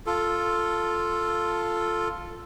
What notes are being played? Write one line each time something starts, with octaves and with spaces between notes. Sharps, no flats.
F4 A4